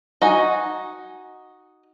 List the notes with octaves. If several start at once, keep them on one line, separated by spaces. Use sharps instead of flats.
D#4 F#4 G#5